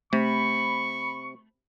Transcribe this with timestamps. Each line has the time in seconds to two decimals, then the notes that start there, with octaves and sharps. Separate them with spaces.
0.13 C3 A3 B5 C#6